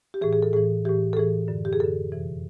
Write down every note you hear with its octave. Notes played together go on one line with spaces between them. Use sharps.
G4
A2 E3 G#4
G#4
A4
A2 E3 G#4
A2 E3 G4
A4
A2 E3 G#4
F#2 D3
G4
G#4
F#2 D3 A4
F2 C3 E3